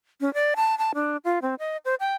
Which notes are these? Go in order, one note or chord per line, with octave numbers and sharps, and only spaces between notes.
C#4
D5
A5
A5
D4
F4
C4
D#5
C5
G5